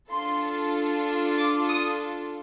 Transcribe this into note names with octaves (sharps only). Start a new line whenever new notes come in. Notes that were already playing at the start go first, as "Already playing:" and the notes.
D4 F4 A4 C6
D6
D#6